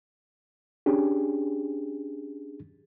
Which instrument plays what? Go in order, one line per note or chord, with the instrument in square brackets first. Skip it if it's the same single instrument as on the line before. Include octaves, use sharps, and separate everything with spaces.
[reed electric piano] C#4 D4 G4 G#4